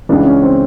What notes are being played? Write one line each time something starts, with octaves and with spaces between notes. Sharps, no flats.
C#2 C#3 E3 D4
C#4
C4